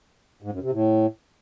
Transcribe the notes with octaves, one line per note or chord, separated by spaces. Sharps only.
G#2
F#2
C3
A2